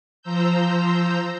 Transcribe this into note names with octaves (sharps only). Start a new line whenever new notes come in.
F3 C5 A#5 E6 G6